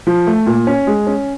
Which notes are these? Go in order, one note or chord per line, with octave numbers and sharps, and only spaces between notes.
F3
A3
A#2
C#4
G#3
C#4